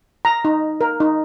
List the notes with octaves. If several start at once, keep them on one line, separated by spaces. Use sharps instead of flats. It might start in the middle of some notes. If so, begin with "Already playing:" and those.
A#5
D#4
A#4
D#4